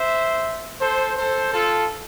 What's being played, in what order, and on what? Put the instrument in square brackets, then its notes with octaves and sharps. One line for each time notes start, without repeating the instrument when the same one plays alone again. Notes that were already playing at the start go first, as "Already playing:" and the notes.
Already playing: [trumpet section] C5 E5
A4 C5
A4 C5
F4 A4